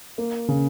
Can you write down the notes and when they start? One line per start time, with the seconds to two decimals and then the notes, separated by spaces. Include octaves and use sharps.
0.18 A#3
0.48 C#3